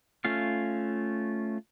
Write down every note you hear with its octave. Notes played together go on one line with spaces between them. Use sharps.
A3 C#4 F4 F5